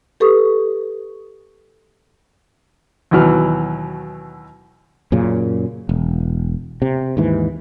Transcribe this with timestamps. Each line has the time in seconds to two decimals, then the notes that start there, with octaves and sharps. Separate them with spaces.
0.20 G4 A4 B4 C#6 D#6
3.11 D#2 B2 E3 F#3 F6
5.12 F#2 A#2 C#3
5.89 E1
6.82 C3
7.17 D#2 G#2 E3